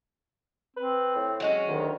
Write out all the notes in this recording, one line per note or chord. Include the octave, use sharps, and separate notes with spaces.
C4 B4
A2
F#3 G#3 C#4
D2 D#3